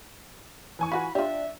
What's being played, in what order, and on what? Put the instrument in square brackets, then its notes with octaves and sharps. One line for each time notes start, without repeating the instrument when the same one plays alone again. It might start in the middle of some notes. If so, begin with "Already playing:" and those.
[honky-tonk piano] E3 G#5 C#6
[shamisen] F4 F#4 B4 [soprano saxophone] B5
[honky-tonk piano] D4 [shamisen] F4 G4 [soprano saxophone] E5